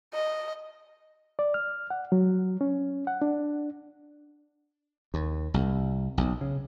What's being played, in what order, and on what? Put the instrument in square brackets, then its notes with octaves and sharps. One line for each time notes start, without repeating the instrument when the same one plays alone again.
[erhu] D#5
[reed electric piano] D5
F6
F#5
F#3
C#4
F#5
D4
[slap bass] D#2
C2
B1
C#3